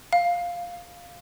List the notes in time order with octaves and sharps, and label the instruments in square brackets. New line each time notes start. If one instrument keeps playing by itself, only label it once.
[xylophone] F5